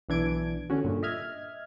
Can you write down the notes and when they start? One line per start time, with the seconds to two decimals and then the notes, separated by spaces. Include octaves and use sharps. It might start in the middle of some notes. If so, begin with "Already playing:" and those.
0.09 B1 E3 D4 G#6 D7
0.70 D3 C#4 F#4
0.84 G2 A#2 D3
1.03 D#5 E5 F6 G#6